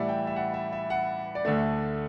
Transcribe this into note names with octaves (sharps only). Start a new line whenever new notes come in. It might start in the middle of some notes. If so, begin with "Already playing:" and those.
Already playing: A2 E3 G3 D5 E5 F#5
G5
E5
F#5
E5
E5
F#5
D5
D2 D3 A3 E5